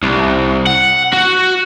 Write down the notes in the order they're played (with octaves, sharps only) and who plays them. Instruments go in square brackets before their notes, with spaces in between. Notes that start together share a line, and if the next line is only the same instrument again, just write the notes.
[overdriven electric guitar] C2
F#5
F#4